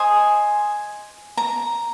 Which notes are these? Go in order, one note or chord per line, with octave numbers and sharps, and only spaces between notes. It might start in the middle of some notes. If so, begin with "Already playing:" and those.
Already playing: G#4 C5 D#5 G#5
A#5